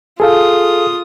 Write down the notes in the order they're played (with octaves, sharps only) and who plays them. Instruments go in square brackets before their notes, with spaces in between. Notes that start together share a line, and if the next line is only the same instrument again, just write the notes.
[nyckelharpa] F4 D#6 [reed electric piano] G#4 A4 F5